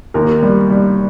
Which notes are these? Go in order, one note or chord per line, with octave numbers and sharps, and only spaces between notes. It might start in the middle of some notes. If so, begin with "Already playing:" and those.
D#2 A#4
G3
G3